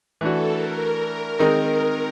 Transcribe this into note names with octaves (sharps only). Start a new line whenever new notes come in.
E3 A3 D4 F#4 A4
A#4
D#3 G#3 C4 D#4